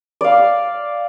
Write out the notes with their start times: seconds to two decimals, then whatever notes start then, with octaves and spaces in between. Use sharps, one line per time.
0.21 D5 F5